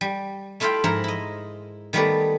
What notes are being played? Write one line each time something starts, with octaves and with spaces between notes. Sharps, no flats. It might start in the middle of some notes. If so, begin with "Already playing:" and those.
G3
A3 E4 F4 E5 F5 G5
G#2 F3 E4 A#4 E5 A#5
E4 D#5
D#3 G3 A3 B3 B4 D5